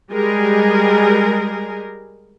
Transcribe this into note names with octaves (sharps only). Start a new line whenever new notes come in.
G3 G#3 G#4 A#4